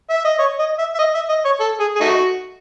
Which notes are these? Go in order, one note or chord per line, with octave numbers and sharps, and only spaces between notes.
E5
D#5
C#5
D#5
E5
E5
D#5
E5
D#5
C#5
A4
G#4
G#4
A3 D#4 F#4